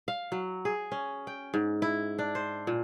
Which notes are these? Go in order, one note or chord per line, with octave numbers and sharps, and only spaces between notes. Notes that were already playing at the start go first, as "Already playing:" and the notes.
F5
F#3
G#4
C#4
G5
G#2
E4
D4
C5
A#2